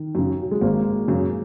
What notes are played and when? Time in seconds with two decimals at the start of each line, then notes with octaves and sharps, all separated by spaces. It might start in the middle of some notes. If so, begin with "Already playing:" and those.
Already playing: D#3
0.15 F#2 C#3
0.42 F#3
0.51 G#3
0.61 G#1 A#3
1.08 F#2 C#3